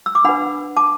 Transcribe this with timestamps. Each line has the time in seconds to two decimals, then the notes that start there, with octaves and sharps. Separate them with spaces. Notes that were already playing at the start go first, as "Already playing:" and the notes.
0.06 E6
0.15 D6
0.24 D4 B4 F#5 B5
0.77 A5 D6